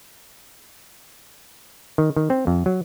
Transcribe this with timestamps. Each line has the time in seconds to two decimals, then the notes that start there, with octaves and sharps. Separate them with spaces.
1.98 D#3
2.16 D#3
2.30 C4
2.47 F2
2.66 F#3